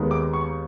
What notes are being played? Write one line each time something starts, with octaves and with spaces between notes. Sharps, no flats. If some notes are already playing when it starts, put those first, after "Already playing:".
Already playing: D#2 D#3 G#3 B3
D6
C#6